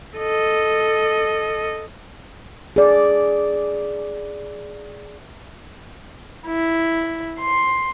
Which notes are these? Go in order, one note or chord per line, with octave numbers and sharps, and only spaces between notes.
A4 D#5
G#4 D5
E4
C6